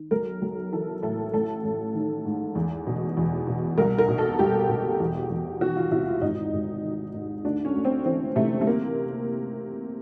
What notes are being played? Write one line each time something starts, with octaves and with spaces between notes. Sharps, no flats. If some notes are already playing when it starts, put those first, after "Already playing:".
Already playing: D#3
B1 A#4
B1
E3 A4
A2 A4
A1 A4
A1
D#3
G#2
E2
B2
E2
B2
C2 A#4
A#4
B2
A4
C2 G4
B2
E2
E2
D#3 F#4
F4
C3 E4
F4
G#1 D#4
G#1
D#3
G#2
D2 D4
C#4
D2
C4
E3 C4
C3 A3
A3
A#3